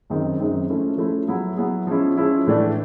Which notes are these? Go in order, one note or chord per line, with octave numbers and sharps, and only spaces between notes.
F#2 D#3 G#3 C4 D#4
F#2 D#3 G#3 C4 D#4
F3 A3 C#4 E4
F3 A3 C#4 E4
F#3 B3 E4 G#4
F#3 B3 E4 G#4
F3 G#3 C#4 E4
F3 G#3 C#4 E4
A2 E3 A3 D4